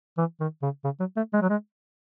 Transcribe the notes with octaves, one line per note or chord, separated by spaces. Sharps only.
E3
D#3
C#3
C#3
F#3
A3
G#3
F#3
G#3